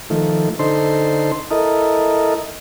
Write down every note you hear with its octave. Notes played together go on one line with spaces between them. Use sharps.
D#3 F3 A3
D3 D#4 A4 C5 C6
E4 A4 A#4 D#5